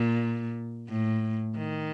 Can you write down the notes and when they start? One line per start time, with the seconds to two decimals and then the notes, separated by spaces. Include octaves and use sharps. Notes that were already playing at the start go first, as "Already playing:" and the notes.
Already playing: A#2
0.88 A2
1.57 D#3